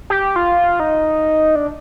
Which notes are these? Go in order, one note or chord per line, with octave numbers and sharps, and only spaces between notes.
G4
F4
D#4
D4